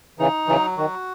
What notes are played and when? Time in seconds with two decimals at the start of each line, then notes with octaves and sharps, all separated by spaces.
0.19 C#3 E3 D#4
0.48 C#3 E3 F#3
0.77 D#3 F#4